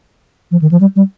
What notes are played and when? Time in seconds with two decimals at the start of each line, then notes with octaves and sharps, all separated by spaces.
0.51 F3
0.62 D#3
0.71 F3
0.81 G3
0.96 G3